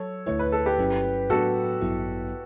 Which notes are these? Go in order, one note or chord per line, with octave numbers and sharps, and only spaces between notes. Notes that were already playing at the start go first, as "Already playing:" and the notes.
Already playing: F#3 A4 C#5
D2 D3 A3 E4 C#5
B4
A4
G4 B4
G1 G2 F#3 C#4 E4
A2 F#3 B3 D4 F#4 A4
A1 G2 F#3 B3 E4